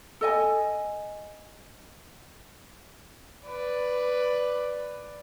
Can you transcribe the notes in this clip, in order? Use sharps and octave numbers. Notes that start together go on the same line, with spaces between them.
A4 D#5 G#5
B4 D5